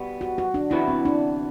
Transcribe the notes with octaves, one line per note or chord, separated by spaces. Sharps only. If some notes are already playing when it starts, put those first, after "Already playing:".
Already playing: B2 G3 B3
F#4
F#4
D4
C3 E3 B3 E4 F#4 B4
C4
D4